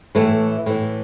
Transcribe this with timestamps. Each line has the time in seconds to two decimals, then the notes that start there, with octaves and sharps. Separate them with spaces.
0.15 A2 E3 A3
0.66 A2 E3